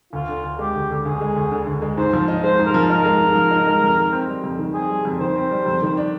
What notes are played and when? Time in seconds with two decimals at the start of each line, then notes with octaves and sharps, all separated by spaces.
0.13 D2 F4
0.29 D3
0.44 D2
0.59 G#3 G4
0.75 D2
0.90 D3
1.05 D2 G#4
1.21 G#3
1.36 D2
1.52 D3
1.67 D2
1.82 G#3
1.97 G#2 C5
2.13 F3
2.28 D#4
2.43 G#3 C5
2.59 G#2
2.67 A#4
2.74 F3
2.89 D#4 A#4
3.05 G#3
3.20 G#2
3.36 F3
3.51 D#4
3.66 G#3
3.82 F2
3.97 D#3
4.13 C4
4.28 G3
4.44 F2
4.59 D#3
4.74 C4 G#4
4.90 G3
5.05 F2
5.20 D#3 C5
5.35 C4
5.51 G3
5.66 F2
5.82 D#3
5.97 D4